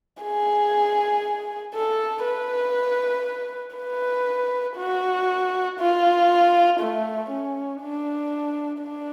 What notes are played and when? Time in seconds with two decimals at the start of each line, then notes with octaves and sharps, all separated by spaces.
0.24 G#4
1.74 A4
2.24 B4
3.76 B4
4.77 F#4
5.79 F4
6.80 A3
7.30 C#4
7.82 D4
8.82 D4